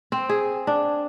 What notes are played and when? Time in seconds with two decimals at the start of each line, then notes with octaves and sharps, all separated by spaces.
0.12 C4
0.29 G#4
0.67 D4